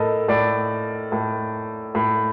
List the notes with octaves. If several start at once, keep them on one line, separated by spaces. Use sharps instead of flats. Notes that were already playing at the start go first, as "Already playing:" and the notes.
Already playing: A2 A4 A#4 D#5
A2 D5
A2
A2